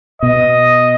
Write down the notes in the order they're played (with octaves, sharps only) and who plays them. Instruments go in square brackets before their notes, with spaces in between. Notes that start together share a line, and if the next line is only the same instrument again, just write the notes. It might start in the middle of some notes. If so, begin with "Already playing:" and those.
[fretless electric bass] B2 [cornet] D#5